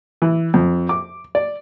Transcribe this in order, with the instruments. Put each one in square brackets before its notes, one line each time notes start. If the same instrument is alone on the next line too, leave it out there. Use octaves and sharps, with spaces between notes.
[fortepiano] E3
F2
D6
D5